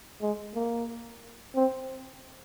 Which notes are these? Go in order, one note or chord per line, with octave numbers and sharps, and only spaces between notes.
G#3
A#3
C4